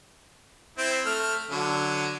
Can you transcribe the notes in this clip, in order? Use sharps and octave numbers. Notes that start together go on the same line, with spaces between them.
C4 E4 G5
A3 F6
D3 F#3